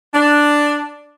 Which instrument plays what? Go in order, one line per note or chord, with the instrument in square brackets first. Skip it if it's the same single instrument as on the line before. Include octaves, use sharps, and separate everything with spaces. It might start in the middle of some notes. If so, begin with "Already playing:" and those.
[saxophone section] D4